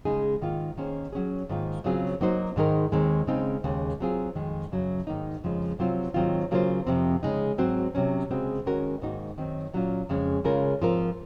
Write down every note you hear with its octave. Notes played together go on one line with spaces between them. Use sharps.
C#3 G#3 D#4 G#4
G#2 D#3 A#3 F4
D#3 A#3 C#4 G#4 C5
F#3 C#4 G#4
G#2 D#3 A#3 F4
C#3 F#3 C4 F4 G#4
F#3 A#3 D#4 F#4 C5
G#2 D#3 G#3 D#4 A#4
D#2 D#3 G#3 C4
C#3 G#3 C4 D#4
D#2 C#3 G#3
F#3 C4 F4 G#4
F2 D#3 G#3
F#2 C#3 F#3
G#2 D#3 A#3 D#4
F2 C#3 F3 G#3
C3 F#3 C4 F4 C5
G#2 D#3 F#3 C4 F4
C#3 F#3 A#3 F4 C5
F2 C3 F3 C4
C#3 G#3 D#4
G#2 F#3 C4 F#4 C5
C3 F#3 C#4
C#3 G#3 C4 F#4
D#3 G#3 C#4 F#4 A#4
G#2 D#3 A#3 D#4 F#4
F#2 D#3 F#3 C4
A#2 F#3 C#4 F4
F2 C#3 G#3 C#4
C#3 G#3 C#4 F4 A#4
G#2 F3 C4 F4 A#4